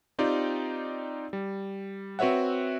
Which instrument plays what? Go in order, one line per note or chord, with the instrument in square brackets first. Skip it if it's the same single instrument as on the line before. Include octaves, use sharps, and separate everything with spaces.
[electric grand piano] C4 D#4 F4 G4 D5
G3
C4 F#4 B4 C#5 E5 F#5